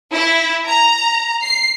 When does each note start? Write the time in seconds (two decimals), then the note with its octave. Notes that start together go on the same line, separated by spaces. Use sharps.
0.12 E4
0.68 A#5
1.44 C7